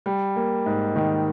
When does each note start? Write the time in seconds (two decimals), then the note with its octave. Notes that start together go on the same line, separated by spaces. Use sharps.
0.06 G3
0.36 A#3
0.66 G#2
0.96 D#3